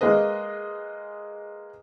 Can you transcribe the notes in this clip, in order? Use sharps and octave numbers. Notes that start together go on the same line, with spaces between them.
G#3 A#3 G#4 B4 D#5